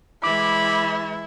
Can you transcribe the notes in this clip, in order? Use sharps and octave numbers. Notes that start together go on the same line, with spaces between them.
E3 G#3 E4 B5 D6